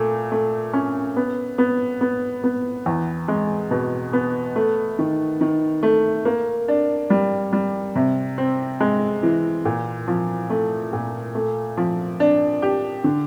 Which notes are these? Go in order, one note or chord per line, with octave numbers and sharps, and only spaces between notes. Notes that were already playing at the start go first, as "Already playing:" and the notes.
Already playing: A#2 A3
A3
C#4
B3
B3
B3
B3
E2
G#3
B2
B3
A3
D#3
D#3
A3
A#3
D4
G3
G3
C3
C4
G#3
E3
A#2
F3
A3
A#2
A3
F3
D4
G4
D3